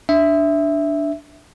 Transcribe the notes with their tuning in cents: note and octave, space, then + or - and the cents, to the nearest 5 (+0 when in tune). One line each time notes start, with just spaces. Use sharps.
D4 +0 E5 +0